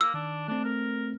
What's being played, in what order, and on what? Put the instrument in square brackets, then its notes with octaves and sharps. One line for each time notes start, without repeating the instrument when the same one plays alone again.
[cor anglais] A#3 [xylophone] E6
[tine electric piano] D#3 [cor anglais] D4
[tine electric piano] A3 C4 [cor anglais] D4
[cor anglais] A#4